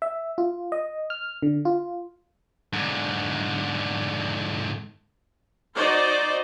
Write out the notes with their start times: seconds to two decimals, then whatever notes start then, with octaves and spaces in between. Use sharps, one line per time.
0.02 E5
0.38 F4
0.72 D#5
1.10 F6
1.42 D3
1.65 F4
2.73 G#2 D3
5.76 D#4 F#4 C5 D5 D#5